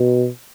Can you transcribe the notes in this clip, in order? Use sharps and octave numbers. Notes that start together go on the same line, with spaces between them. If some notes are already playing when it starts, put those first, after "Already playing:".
Already playing: B2